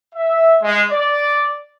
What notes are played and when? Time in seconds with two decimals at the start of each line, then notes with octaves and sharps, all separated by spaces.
0.14 E5
0.62 G#3
0.90 D5